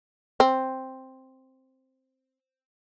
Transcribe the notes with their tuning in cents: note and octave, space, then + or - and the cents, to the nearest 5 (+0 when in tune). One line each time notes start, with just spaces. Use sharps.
C4 +5